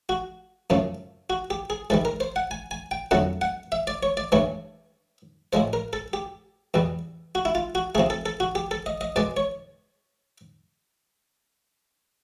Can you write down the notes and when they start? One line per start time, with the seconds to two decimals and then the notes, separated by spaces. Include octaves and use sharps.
0.09 F#4
0.70 F#2 C#3 F3 A3
1.30 F#4
1.50 G4
1.70 G#4
1.90 G#2 E3 G3 A4
2.05 A#4
2.20 C5
2.36 F#5
2.51 G#5
2.71 G#5
2.91 G5
3.11 F2 D3 F#3 A3 F#5
3.41 F#5
3.72 E5
3.87 D5
4.03 C#5
4.17 D5
4.32 G2 E3 A3 C#5
5.53 A2 F3 G#3 C5
5.73 A#4
5.93 A4
6.13 G4
6.74 E2 B2 G3
7.35 F#4
7.45 E4
7.55 F4
7.75 F#4
7.95 C3 F3 A3 G#4
8.10 A4
8.26 A4
8.40 F#4
8.55 G4
8.71 A4
8.86 D#5
9.01 D#5
9.16 B2 G#3 D5
9.37 C#5